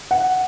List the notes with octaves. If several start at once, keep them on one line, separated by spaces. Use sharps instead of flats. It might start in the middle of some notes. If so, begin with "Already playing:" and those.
F#5